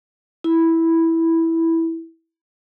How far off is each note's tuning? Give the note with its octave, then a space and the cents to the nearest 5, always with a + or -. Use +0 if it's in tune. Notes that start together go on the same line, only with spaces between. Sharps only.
E4 -5